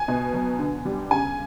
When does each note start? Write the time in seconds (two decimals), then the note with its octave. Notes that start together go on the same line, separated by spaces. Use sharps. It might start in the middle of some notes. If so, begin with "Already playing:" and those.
Already playing: G#5
0.08 B2
0.34 F#3
0.59 D3
0.85 G3
1.11 C#3 G#5